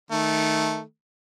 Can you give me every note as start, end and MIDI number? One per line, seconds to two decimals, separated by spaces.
0.11 0.81 51
0.11 0.81 57